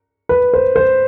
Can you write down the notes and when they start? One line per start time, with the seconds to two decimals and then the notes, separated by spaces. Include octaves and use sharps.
0.29 B4
0.54 C5
0.76 C5